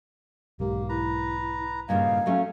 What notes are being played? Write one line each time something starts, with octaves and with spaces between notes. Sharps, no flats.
B1 G#2 A#3 G4
E4 B4 A#5
G2 A#2 C#3 D#4 F5 G#5
F#3 A3 C#4